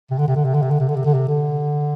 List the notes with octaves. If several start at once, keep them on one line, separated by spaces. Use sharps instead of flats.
C3
D3
C3
D3
C3
D3
C3
D3
C3
D3
C3
D3
C3
D3